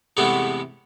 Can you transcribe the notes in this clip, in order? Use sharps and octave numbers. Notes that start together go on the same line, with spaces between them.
E2 A2 C3 G#3 A3 B3